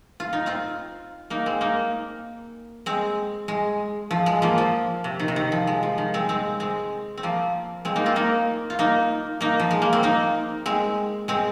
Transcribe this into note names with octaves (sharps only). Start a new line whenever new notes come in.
F4
D#4
C4 F4
A#3 D#4
G#3 C4
A#3 D#4
G#3 C4
G#3
F3
G#3
F3 A#3
F3
C3
D#3
C3
D#3
F3
G#3
F3
D#3
G#3 C4
G#3 C4
G#3 C4
C4
F3 A#3
G#3 C4
A#3 D#4
C4 F4
A#3 D#4
F4
A#3 D#4
A#3 D#4
F3
G#3
A#3
C4
A#3 D#4
G#3 C4
G#3 C4